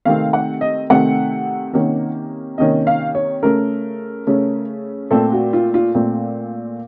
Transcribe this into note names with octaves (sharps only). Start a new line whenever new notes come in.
C3 D#3 A3 C4 F5
F#5
D#5
C3 D#3 A3 C4 F#5
C3 D#3 A#3 C#4
C3 D#3 A#3 C#4 D#5
F5
C#5
C#3 A3 C#4 A#4
C#3 A3 C#4
A#2 A3 C4 A4
F#4
F4
F4
A#2 A3 C4